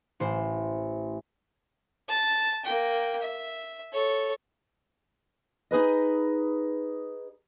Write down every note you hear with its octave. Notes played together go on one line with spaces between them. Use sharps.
A1 C5
A5
A#3 G5
E5
A4 C#5
D#4 G#4 B4 D#5